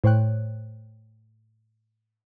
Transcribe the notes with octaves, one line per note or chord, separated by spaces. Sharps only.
A2 C5 C#5 G5 F#6